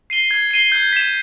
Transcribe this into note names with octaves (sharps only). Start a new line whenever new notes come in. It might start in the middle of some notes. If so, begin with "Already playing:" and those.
C7 D#7 G7
G#6
C7 D#7 G7
G6
B6 E7